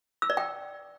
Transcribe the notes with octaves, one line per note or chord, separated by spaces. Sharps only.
E6
D5
G5